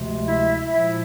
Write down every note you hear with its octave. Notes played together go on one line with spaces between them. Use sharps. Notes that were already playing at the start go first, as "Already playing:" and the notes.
Already playing: D2 C3 F3 G#3
E4 E5
A#2 F3 G#3 E4 E5